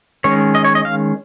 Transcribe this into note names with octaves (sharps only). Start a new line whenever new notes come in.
D#3 G#3 C#4 C#5
D#5
C#5
D#5
F5